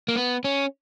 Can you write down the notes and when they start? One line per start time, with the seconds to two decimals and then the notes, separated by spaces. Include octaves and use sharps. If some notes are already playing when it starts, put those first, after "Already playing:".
0.08 A#3
0.16 B3
0.44 C#4